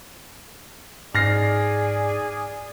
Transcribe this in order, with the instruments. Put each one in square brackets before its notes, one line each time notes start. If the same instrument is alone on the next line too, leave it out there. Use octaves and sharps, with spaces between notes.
[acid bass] G#2 [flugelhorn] G#4 [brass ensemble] D5 [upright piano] F6 A#6 C7